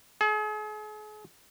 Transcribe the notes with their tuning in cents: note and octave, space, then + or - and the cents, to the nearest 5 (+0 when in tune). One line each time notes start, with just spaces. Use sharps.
G#4 +40